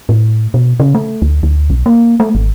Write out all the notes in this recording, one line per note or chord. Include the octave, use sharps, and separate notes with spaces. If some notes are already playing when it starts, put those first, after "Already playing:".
A2
B2
C#3
A3
D2
D2
B1
A#3
A3
G#1